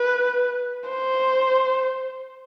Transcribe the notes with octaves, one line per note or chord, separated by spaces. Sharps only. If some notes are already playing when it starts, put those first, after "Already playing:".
Already playing: B4
C5